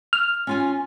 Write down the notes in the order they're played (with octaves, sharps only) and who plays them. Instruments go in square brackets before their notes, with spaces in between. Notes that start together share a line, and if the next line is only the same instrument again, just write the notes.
[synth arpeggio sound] F6
[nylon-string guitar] C#4 F4 G#5